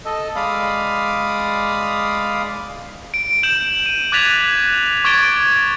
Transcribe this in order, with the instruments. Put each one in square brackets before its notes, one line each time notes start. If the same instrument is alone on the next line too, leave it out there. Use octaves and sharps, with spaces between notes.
[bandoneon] A4 D#5
G#3 D5 F5 B5 D#6
[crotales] D7
G6 E7 F#7
D#7
D6 F#6 G#6 A6 B6 F7
C#6 D6 G#6 A6 D7 G7